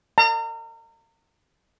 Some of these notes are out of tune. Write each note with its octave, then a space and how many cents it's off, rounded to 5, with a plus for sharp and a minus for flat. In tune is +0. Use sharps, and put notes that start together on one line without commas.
A#5 -35